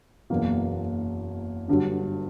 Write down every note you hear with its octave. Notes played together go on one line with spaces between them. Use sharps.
F#1 E2 B2 F#3 A#3
G1 G2 D3 F#3